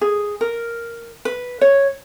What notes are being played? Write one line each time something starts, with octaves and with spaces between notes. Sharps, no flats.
G#4
A#4
B4
C#5